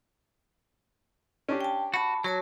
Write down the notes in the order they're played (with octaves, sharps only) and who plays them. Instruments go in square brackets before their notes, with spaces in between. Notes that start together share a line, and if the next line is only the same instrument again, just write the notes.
[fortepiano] C#4 D4 G4
[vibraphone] G5 A5
[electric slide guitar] F#4 [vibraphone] A5 B5
[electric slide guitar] F#3 [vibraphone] F#4 C#5 A5